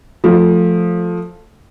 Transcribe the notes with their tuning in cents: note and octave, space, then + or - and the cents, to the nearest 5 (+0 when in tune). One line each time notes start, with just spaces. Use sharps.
F3 +10 A3 +0